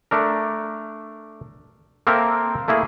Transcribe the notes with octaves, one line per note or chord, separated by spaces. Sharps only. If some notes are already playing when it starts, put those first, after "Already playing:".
A3 D4 A#4
A#3 C4 A4 A#4 E5 G5
A3 A#3 E4 G#4